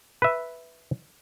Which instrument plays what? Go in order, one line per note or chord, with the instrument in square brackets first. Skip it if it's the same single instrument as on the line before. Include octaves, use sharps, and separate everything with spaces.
[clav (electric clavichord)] B4 E5